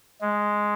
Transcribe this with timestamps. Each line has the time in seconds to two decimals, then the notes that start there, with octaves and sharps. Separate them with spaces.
0.21 G#3